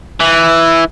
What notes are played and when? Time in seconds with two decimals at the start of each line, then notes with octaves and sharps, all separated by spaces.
0.20 E3